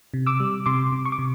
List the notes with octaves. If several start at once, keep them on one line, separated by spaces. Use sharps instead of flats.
C3
D6 E6
G3
C3 C6 D6
C3
C#6
D6
C3